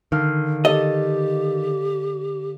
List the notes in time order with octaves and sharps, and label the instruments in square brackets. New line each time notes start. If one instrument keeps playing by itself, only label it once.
[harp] D3 F5 F6 [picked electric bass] D#3
[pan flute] G4 [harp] A4 [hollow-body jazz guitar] D#5